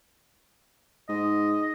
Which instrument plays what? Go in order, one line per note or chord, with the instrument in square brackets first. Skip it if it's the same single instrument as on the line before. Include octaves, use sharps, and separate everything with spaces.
[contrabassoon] G#2 [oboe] D#5